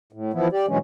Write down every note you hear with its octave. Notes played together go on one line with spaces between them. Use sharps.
A2
E3 F3 B3 E4
G4 D5
G2 B2 E3 F#3 G#3 C#4